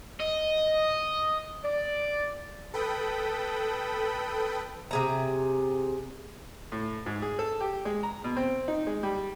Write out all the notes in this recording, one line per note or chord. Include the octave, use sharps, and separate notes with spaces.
D#5
D5
A4 B4 G5 B5 D#6
C3 G#4 A#5
A2
G#2
G#4
A4
G4
G#3
A#5
B2
C4
D#4
G#3
G3